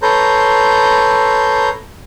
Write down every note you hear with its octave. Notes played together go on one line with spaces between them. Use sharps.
A4 B4 C#5 A#5 C6 G6